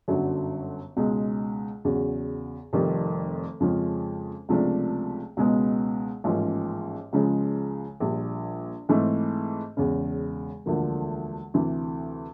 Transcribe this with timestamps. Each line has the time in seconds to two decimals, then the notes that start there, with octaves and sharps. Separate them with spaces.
0.08 G1 F#2 D3 F#3
0.96 C#2 B2 G#3
1.85 E2 C#3 F#3
2.73 F1 F2 C3 D#3 G3
3.60 F2 C#3 F3 G#3 C#4
4.49 C#2 C3 F3 A3 D4
5.37 C#2 B2 G#3 B3
6.24 A1 G#2 F3 A#3 C#4
7.13 C#2 C#3 F3 G#3
8.00 A#1 A#2 G3
8.89 G#2 E3 A3 C4
9.77 E1 E2 C#3
10.66 E1 D2 D3 F3 A#3
11.54 D2 C3 E3